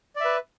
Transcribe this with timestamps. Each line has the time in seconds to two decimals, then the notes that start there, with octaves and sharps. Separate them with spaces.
0.16 D5
0.20 E5
0.25 B4